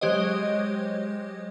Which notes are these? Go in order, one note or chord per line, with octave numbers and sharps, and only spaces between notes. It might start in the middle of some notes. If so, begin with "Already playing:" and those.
F#3 G#3 G4 C5 C#5 D#5